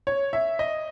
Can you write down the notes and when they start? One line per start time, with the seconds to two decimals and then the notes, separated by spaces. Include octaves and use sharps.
0.07 C#5
0.33 E5
0.59 D#5